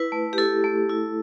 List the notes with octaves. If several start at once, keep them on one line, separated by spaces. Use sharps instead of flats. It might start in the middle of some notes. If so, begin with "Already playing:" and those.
Already playing: E4 B4
A3
G4
E4 A4
A3
E4